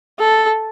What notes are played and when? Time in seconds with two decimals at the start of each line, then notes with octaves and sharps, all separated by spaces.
0.19 A4